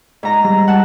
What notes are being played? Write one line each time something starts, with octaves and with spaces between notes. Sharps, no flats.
G#2 A#5
G3 A#5
F#5 A5